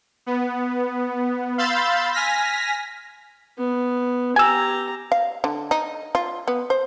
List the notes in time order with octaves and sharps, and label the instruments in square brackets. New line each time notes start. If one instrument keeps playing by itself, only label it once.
[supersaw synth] B3
F5 B5 C6 E6 G6 A6
G#5 F6 A#6 B6
[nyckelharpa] B3
[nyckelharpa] G4 A#5 [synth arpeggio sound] G#5 E6
[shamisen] F5
D3
D#4
F4
B3
C5